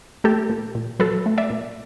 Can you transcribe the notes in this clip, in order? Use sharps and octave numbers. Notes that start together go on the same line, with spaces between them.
A3 G4 A4
A#2
A#2
F#3 A4 B4
A3
D5 E5
A#2